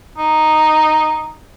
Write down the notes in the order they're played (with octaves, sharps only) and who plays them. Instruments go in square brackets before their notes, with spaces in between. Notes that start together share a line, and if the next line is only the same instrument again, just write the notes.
[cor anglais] D#4